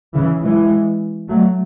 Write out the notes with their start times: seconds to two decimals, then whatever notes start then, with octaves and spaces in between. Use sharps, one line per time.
0.14 C#3 E3
0.43 E3 G#3
1.28 F#3 A3